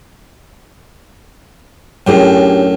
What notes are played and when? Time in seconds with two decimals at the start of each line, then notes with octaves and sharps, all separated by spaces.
2.07 F#2 A2 D4 G4 G#4